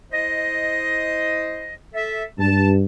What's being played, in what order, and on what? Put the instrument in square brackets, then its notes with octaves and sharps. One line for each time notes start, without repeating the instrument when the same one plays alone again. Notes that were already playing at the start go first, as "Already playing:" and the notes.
[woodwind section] E4 C5 D#5
A4 E5
[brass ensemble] G2 [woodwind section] A5